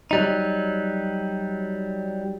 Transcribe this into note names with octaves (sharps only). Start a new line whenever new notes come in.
F#3 G3 D#4